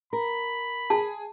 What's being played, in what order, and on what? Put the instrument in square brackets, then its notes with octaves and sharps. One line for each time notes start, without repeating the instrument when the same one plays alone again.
[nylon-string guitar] A#4 [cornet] B5
[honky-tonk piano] G#4 [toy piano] A5